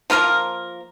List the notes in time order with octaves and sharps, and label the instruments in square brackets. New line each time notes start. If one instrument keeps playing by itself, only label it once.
[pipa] F3 A#3 F4 A#4